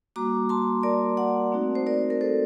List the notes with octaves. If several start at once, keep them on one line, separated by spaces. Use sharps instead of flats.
G3 A#3 F#4 A#5 D6
A5 C6
A#4 D5
D5 F#5
A3 C4 D#4 F#4
C5
A#4 D5
A#4
A4 C5